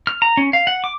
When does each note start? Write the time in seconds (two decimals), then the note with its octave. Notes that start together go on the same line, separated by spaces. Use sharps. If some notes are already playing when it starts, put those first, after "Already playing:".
0.07 F6
0.22 A#5
0.37 C#4
0.53 F5
0.67 F#5
0.84 D6